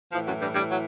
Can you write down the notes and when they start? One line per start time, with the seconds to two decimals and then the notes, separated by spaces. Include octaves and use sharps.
0.12 A2 E3 F3
0.26 F#2 F#3
0.41 G2 G3
0.55 G2 G3
0.70 F#3